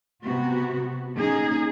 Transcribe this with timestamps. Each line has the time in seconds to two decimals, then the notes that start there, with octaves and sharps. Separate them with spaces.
0.25 C3 B3 F#4
1.14 A#3 C#4 D#4 G#4